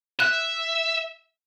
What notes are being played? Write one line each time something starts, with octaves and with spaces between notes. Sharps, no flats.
E5 F#6